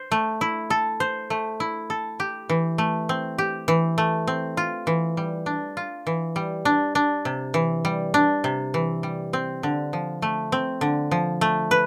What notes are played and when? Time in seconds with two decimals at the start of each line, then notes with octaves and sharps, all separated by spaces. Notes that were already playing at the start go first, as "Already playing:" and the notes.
Already playing: C5
0.11 A3
0.41 E4
0.70 A4
1.00 C5
1.30 A3
1.60 E4
1.90 A4
2.20 G4
2.49 E3
2.78 A3
3.09 C4
3.38 G4
3.68 E3
3.98 A3
4.27 C4
4.57 F4
4.87 E3
5.17 G3
5.46 D4
5.77 F4
6.07 E3
6.36 G3
6.65 D4
6.95 D4
7.25 C3
7.54 E3
7.85 G3
8.14 D4
8.44 C3
8.74 E3
9.03 G3
9.33 C4
9.63 D3
9.93 F3
10.22 A3
10.52 C4
10.81 D3
11.11 F3
11.41 A3
11.71 B4